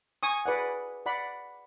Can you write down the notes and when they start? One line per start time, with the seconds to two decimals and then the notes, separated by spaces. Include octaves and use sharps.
0.23 G#5 C#6 D#6
0.46 G#4 B4 D5 F#5
1.06 D5 F#5 B5